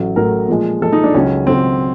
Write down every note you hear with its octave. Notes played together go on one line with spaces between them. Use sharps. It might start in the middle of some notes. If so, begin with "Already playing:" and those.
Already playing: A1 A2 F#3
A1 A2 F#3 A#4
A#2 F3 G#3
A#2 F3 G#3 A4
D#4
D4
C#2 C#3 F#3 C#4
C#2 C#3 F#3 C4